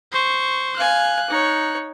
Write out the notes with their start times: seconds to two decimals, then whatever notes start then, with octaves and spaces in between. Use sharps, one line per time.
0.12 C5 C#6
0.76 F5 G#5 F#6
1.29 D#4 C#5